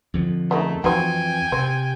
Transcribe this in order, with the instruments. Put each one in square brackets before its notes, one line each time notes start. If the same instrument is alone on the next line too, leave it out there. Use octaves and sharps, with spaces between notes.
[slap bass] F2 D3 F3
[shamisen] C#3 A#3 D#4 [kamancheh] A3
[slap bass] F2 E3 [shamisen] C4 D#4 F#4 [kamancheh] G5 G#5
[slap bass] C3 [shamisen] C4